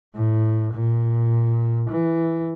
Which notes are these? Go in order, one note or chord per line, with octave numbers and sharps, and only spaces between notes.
A2
A#2
E3